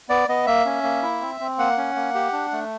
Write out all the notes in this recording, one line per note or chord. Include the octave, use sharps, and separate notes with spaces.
B3 D5
B3 D#5
A#3 E5
C#4
A#3
E4
C4
C4
A#3 F#5
C#4
A#3
G4
D4
A3